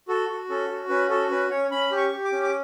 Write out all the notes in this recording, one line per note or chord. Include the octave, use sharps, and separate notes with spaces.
F#4 A4
F#4
C#4 A4
F#4
C#4 B4
F#4 A4
C#4 B4
C#4 C#5
C#4 B5
G4
C#6
G4
D6
C#4
D6